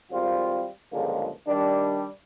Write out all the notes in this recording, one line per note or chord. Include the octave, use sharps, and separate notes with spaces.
G#1 G3 C4 F4
C#2 G2 D3 F3 G#3 A#3
D#3 G3 D4